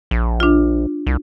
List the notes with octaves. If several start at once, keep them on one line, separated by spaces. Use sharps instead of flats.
A#1
D4 F4
C2